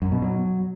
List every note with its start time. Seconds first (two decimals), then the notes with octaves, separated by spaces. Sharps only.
0.02 F#2
0.12 B2
0.22 F#3